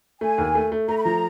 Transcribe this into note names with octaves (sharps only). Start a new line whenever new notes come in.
A3 G#5
D#2
A3
A3
A3 A#5
B5
F3 A#5